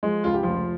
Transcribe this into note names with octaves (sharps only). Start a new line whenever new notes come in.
F3 G#3
C#2 F4
G4
F1 F3 F4